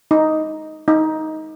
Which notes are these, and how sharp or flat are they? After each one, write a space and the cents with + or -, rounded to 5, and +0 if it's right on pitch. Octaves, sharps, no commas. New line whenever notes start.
D#4 +5
D#4 +15